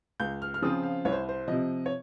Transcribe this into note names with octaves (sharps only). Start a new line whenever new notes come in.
C#2 G6
F6
F6
C#3 F3 C4 F4 D#6
F5
C2 C#5
C5
C5
C3 F3 D#5
C#5